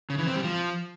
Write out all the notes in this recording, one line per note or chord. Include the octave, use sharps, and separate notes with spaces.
C#3
E3
C4
G3
F3